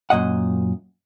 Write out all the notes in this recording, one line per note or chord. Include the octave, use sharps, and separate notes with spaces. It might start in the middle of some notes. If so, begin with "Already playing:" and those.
F#2 A#2 D#5 F#5